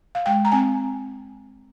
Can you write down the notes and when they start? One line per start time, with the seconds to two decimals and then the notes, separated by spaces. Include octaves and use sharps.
0.15 F5
0.26 G#3 G5
0.45 A#5
0.52 C4 G#5